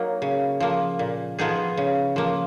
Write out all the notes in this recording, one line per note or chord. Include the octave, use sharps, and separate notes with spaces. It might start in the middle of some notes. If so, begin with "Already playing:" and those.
Already playing: F#3 A#3 D#4
C#3
F3 A#3
A#2
F3 B3 D#4 G#4
C#3
F3 A#3